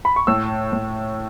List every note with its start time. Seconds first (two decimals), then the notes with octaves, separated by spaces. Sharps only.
0.05 B5
0.16 C#6
0.27 A2 E6
0.73 A2